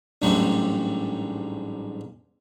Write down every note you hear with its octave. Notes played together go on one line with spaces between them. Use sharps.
A1 D2 G#2 F#3 G3